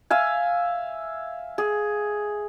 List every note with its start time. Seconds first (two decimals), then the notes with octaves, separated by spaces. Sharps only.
0.10 E5 F5 G#5
1.58 G#4